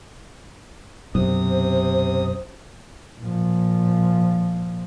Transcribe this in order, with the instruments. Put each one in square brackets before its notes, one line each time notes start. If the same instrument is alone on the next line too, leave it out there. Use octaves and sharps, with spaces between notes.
[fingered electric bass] B1 F#2 [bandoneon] C3 D#6 [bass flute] C5
[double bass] A#2 F3